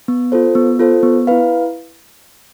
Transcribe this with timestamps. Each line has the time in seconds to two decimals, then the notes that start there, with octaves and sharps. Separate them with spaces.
0.08 B3
0.32 F4 A4 C5
0.55 B3
0.79 F4 A4 C5
1.03 B3
1.27 E4 B4 F5